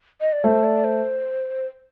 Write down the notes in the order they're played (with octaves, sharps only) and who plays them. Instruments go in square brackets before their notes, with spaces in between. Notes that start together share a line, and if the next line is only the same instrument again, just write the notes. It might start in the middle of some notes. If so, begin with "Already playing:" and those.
[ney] D#5
D5
[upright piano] A3 [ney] C5
[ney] D5
C5